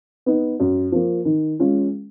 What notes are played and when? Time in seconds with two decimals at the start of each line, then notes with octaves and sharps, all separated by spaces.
0.26 B3 D#4
0.60 F#2
0.92 F3 A#3
1.25 D#3
1.59 G#3 C#4 F4